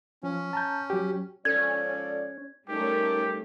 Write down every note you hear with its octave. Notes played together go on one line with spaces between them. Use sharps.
F3 C#4
A5 A#5 G6
F#3 F#4 G4
G#2 F3 C#4 A4 D5 G#6
G3 A3 C#4 D#4 G4 A#4